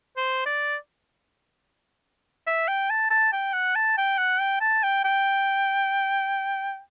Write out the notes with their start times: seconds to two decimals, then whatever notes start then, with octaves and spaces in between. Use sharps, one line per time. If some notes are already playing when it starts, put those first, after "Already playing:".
0.17 C5
0.46 D5
2.47 E5
2.68 G5
2.90 A5
3.11 A5
3.33 G5
3.54 F#5
3.76 A5
3.98 G5
4.18 F#5
4.40 G5
4.61 A5
4.83 G5
5.04 G5